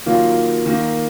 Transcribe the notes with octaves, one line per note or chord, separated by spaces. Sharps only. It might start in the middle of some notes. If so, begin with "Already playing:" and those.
D#3 F#3 A#3 F4
D#3 A#3